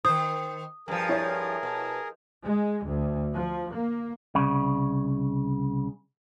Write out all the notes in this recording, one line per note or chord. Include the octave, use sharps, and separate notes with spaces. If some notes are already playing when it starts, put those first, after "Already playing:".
D#3 C5 D#6
G2 F3 G#4 A#4
E4 C#5
B2
G#3
D2
F3
A#3
C2 C#3